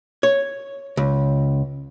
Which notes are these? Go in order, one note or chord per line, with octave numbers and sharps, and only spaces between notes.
C#5
C#2